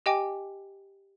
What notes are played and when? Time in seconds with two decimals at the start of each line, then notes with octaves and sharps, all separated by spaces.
0.06 G4 D#5 G5 G#5 D6